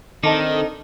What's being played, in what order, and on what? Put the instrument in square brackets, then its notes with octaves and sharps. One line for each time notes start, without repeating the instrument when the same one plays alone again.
[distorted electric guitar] D#3 [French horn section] C4 D4 A4 [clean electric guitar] D#4 [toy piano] D#5 A5 D6